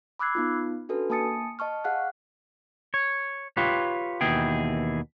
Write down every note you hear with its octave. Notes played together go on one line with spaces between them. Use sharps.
B5 D6 E6 F#6 G#6 C7
B3 D#4 F4
C#4 D4 F#4 A4 B4
A#3 G#5 A5 D#6 A6 C#7
D#5 A5 C#6 F6
G#4 F5 F#5 F6 F#6
C#5
F4 G4 B4 C#5
D#2 B2 E3 G#4 G5